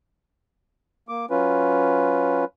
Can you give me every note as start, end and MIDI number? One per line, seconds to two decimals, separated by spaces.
1.09 1.26 58
1.09 1.26 86
1.30 2.45 54
1.30 2.45 61
1.30 2.45 65
1.30 2.45 71